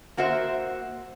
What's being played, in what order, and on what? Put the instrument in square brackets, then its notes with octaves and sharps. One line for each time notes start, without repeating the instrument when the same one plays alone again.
[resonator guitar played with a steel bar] A#3 F#4 C5 E5